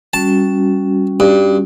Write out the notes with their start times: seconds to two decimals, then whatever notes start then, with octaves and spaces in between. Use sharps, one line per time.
0.13 G3 C#4 F#4 A5
1.20 G2